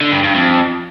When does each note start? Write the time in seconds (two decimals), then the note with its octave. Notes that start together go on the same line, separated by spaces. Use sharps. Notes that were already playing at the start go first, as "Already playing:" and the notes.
0.01 D3
0.12 G2
0.24 G2
0.35 F2